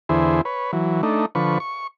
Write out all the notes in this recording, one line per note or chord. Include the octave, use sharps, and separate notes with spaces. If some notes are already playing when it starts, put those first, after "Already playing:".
E2 D3 E4 G#4 C5
B4 C#5
E3 F#3
A3 D4 D#4
D3 F3 B4 C#6
C#6